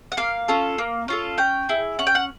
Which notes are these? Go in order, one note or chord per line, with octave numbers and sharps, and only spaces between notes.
F#5
A#3 F5
C#4 F4 A4
A#3
C#4 F4 A4
C#4 G5
E4 G#4
C#4 F#5
G5
F#5